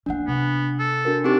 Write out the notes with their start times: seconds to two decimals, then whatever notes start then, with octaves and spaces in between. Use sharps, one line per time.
0.06 E3 A#3 D4 F#5
0.27 C3 B3
0.79 A4
1.05 D4 F#4 A#4
1.24 C4 D4 D#4 G4